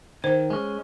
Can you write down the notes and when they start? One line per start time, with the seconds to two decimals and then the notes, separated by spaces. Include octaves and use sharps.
0.24 D#3 C5
0.50 G#3 C#4